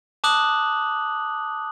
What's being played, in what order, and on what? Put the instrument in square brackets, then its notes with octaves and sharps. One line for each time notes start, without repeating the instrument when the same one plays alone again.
[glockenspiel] A5 D6 D#6 F#6 F#7